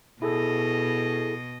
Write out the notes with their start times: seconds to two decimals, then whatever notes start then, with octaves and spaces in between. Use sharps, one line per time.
0.22 B2 E4 G#4 A4 D#5